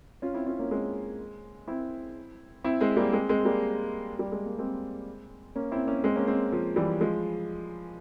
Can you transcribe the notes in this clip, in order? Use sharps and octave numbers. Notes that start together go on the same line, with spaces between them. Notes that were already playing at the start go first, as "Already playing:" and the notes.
C#4 F4
C4 E4
C#4 F4
A#3 C#4
G#3 C4
C4 E4
C4 E4
G#3 C4
G3 A#3
G#3 C4
G#3 C4
G3 A#3
G3
G#3
A#3
G#3 C4
A#3 C#4
C4 E4
A#3 C#4
G#3 C4
A#3 C#4
G#3 C4
F3
E3 G3
F3 G#3